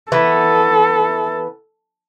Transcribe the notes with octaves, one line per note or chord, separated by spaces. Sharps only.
E3 B3 A4